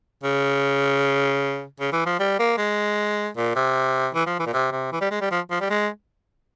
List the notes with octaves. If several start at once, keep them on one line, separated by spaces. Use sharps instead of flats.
C#3
C#3
E3
F3
G3
A#3
G#3
A#2
C3
E3
F3
E3
A#2
C3
C3
E3
G3
G#3
G3
F3
F3
G3
G#3